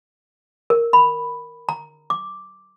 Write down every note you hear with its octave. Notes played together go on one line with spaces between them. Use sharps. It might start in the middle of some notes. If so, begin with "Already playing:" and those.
A#4
B5
A#5
D6